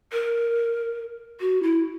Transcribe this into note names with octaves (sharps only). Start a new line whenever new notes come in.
A#4
F#4
E4